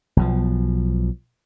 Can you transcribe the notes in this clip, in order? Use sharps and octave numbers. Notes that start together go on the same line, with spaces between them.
B1 B2 F3